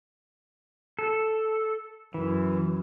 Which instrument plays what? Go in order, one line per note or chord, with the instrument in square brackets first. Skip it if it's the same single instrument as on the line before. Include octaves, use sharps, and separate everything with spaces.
[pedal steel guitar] A4
[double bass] F#2 [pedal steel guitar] E3